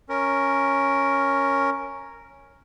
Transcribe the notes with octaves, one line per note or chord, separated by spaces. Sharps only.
C#4 A#4